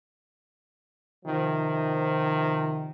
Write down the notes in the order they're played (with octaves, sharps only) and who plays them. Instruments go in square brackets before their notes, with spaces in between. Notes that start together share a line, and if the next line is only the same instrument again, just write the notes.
[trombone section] C3 D#3 F3